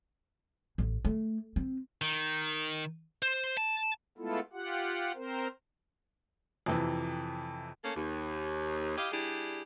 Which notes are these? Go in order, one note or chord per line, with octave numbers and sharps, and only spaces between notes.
A1
A3
C4
D#3
C5
A5
G#3 A3 B3 E4 F4 A4
F4 G4 F#5
C4 A#4 C5
F2 C3 E3
A3 A#3 C#4 A4
D#2
E4 G4 D#5 F5
G3 D4 E4 G4 G#4